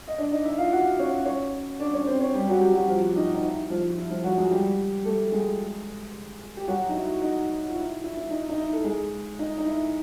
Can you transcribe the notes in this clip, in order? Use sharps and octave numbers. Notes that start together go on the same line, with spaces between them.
D#5
D4 D5
D#4 D#5
E4 E5
F4 F5
F#4 F#5
C#4 C#5
C#4 C#5
D4 D5
C#4 C#5
C4 C5
C#4 C#5
G3 G4
F#3 F#4
G3 G4
F#3 F#4
F3 F4
D#4
D#4
E4
F3 F4
E4
F3 F4
F#3 F#4
G#3 G#4
G3 G4
A3 A4
G#3 G#4
G4
F#3 F#4
D#4
E4
D#4
F4
E4
E4
E4
D#4
D#4
E4
A4
G#3 G#4
D#4
D#4
E4